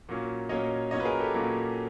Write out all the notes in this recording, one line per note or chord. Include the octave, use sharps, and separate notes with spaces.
A#2 F#3 A#3 C#4
A#2 F#3 A#3 C#4 C#5 D#5
A#2 F#3 A#3 C#4 C#5 D#5
B4
G#4 A#4
G4 A4
A#2 F#3 A#3 C#4